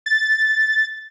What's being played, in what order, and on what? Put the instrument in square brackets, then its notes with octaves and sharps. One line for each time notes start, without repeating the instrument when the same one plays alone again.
[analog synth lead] A6